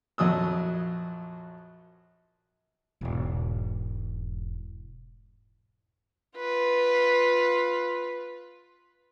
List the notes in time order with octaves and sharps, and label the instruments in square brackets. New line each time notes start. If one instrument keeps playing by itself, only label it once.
[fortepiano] A#1 F2 F#3 D#6 E6
[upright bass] E1 G#2
[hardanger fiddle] F4 B4